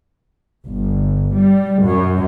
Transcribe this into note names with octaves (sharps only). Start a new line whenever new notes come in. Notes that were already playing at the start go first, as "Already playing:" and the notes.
G1
G3
F#2